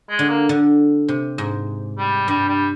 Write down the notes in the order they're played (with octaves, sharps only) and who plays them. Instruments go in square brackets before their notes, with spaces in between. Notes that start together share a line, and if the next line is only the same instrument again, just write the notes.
[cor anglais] G#3
[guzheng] D3
[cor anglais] A#3
[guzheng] D3
C3
G#2
[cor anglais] G3
[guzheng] G2 [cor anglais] G3
[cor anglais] G3